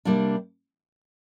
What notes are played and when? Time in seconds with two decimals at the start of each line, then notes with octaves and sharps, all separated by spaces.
0.05 C3 G3 A#3 D4